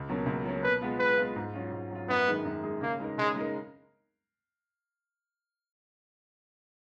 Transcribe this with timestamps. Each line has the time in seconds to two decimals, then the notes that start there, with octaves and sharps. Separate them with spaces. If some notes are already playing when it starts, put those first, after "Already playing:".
Already playing: C#2
0.09 B2 F#3 A#3 C#4
0.26 C#2
0.46 B2 F#3 A#3 C#4
0.63 B2 B4
0.81 G#3 B3 F4
0.99 B2 B4
1.18 G#3 B3 F4
1.36 G#2
1.54 F#3 C#4 F4
1.72 G#2
1.91 F#3 C#4 F4
2.09 F#2 B3
2.27 D#3 G#3 D#4 G#4
2.45 F#2
2.63 D#3 G#3 D#4 G#4
2.81 C#3 A#3
3.00 G#3 D#4 A#4
3.18 C#3 G#3
3.36 G#3 D#4 A#4